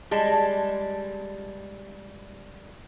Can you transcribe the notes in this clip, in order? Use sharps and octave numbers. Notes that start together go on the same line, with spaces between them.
G3 G#3 A5